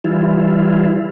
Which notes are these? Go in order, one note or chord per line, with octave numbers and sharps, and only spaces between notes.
E3 G3 E4 F4